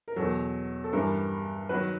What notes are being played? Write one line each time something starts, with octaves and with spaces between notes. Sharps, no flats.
A#4
E2 B2 F#3 A4
A4
G2 E3 G3 A#4
D#3 F#3 B4